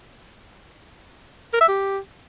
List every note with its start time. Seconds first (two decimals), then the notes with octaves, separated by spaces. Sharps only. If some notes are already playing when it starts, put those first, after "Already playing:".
1.54 A#4
1.61 E5
1.68 G4